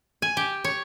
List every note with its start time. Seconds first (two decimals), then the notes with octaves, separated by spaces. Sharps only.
0.22 G#5
0.37 G4
0.64 C#5